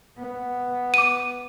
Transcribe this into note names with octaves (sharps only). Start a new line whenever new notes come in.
B3
D6 D#7